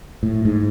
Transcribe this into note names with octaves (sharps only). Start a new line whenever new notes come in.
A2
G#2